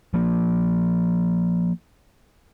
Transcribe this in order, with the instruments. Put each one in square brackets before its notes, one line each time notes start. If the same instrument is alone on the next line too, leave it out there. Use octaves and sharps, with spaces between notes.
[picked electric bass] F3 A#3